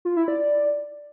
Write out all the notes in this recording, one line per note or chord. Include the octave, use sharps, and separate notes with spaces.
F4
E4
D5